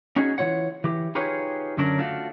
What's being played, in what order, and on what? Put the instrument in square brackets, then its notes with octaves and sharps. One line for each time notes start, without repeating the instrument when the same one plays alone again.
[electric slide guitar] C#4 D#4 F#4 G#4
E3 A3 F4 C#5 F#5
E3 G4
D#4 F4 G4 G#4 B4 C#5
F#2 D3 F#3 C#4 D4 A#4
A3 D4 F4 F#4